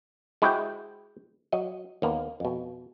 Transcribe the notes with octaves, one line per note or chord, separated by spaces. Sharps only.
G#3 E4 F#4 G4 C5 G5
F#3 D#5
D#2 A#3 B3
F2 B2